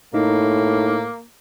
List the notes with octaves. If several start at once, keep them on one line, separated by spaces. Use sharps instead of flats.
A2 A#3 D#4